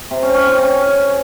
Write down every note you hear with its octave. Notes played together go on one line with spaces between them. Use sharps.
C3
C#4
C#4
C4
C#4